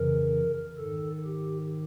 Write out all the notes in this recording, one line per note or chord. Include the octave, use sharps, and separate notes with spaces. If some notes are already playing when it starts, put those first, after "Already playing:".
Already playing: F2 C#3 E3 A#4
G#2 D#3 A4
G4